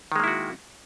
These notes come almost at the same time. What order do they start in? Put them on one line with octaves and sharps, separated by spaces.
D#3 G#3 A#3 E4 F#4